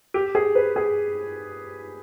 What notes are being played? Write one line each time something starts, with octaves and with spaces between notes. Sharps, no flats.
G4
G#4
B4
G#4